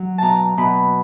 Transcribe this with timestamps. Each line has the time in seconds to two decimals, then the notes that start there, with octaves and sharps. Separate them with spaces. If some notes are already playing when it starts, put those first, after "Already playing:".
Already playing: F#3
0.18 B2 A5 A#5
0.57 B2 B5